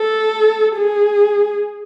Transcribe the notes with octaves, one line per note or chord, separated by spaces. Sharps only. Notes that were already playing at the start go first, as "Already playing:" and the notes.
Already playing: A4
G#4